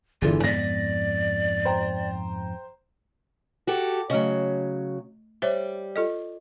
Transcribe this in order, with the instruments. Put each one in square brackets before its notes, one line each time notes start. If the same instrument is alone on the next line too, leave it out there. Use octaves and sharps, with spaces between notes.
[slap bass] G1 [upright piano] E2 D3 E3 [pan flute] F4
[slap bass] F2 G#2 B3 [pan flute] D5 [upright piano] A#6 B6
[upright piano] C5 G5 A#5
[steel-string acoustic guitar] F#4 G4 A4
[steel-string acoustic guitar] C#3 F#3 [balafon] A3 D#5
[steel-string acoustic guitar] G3 [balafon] C5 C#5 E5
[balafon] F4 A4 D#5